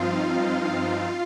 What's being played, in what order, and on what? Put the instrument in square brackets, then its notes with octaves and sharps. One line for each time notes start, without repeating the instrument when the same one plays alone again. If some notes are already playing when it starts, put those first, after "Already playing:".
Already playing: [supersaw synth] G2 F3 C4 D#4 F4 F5